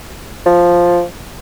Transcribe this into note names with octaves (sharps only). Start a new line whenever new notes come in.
F3